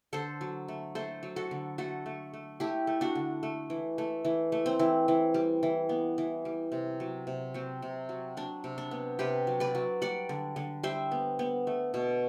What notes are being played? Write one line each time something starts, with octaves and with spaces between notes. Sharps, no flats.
D3 A4 C5
F#3
A3
A3 A4 C5
F#3
F#4 A4
D3
A3 F#4 A4
A3
A3
A3 E4 G4
A3
D4 F#4
D3
A3
E3
A3
E3
A3
C4
E3
E3
G3
E3
B3
E3
G3
C3
F#3
C3
F#3 C4
C3
F#3
F#3 D4
C3
D4
B3
C3 G4 B4
F#3
B4 D5
F#3
G3 D5 F#5
D3
D3
G3 C5 E5
B3
B3
A3
B2